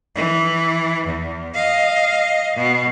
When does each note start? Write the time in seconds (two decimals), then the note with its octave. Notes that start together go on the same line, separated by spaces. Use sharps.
0.15 E3
1.07 E2
1.54 D#5 F5
2.56 B2